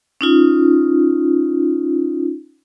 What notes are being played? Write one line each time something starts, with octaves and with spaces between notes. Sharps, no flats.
C#4 D#4 F4